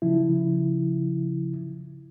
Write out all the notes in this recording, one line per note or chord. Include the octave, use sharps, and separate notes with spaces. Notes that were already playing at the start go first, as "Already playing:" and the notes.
C#3 F3 E4